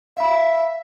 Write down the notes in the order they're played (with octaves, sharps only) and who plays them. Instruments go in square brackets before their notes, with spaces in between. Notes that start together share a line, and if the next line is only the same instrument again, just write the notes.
[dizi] E5 [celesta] F5 B5